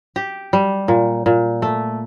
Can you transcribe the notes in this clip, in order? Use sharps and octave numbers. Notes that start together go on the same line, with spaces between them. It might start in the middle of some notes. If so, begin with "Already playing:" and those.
G4
G3
A#2
A#2
A3